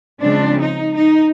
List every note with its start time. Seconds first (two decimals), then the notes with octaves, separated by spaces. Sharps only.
0.21 C#3 F3 G#3 C4 D4
0.62 D#4
0.95 D#4